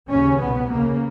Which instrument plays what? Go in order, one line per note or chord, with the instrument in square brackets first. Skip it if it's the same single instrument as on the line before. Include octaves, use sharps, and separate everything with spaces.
[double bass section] D#2 C#3 C#4
C2 B2 B3
D#2 C#3 A#3